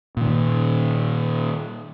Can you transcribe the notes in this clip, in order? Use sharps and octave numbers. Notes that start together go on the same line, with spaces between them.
A#2 D#3